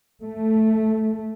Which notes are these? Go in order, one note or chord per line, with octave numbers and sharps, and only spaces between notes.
A3